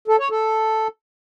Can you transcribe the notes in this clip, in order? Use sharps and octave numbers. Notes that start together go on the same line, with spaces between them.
A4
C#5
A4